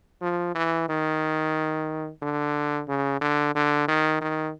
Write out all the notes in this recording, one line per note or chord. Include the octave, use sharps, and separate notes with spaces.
F3
E3
D#3
D3
C#3
D3
D3
D#3
D#3